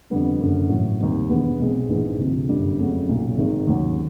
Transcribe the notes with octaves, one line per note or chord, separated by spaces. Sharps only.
F2 D3 G3 B3 D4
F#1 F#2 D3
A1 A2 F#3
D#2 D#3 G3 C4
E2 B2 G#3 B3 D4
B1 B2 G#3 C4
A#1 G#2 E3 G#3 B3
D2 C3 F3
G1 F#2 D3 G3
F2 C#3 F#3 A3 C4
B1 A#2 F#3
G#1 G#2 D#3 G#3
D#2 C#3 F#3